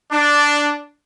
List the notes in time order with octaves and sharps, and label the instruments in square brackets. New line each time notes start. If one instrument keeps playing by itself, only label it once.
[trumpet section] D4